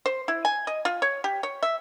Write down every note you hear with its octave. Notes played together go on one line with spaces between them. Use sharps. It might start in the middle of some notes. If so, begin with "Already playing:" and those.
C5
E4
G#5
D#5
F4
C#5
G4
C#5
E5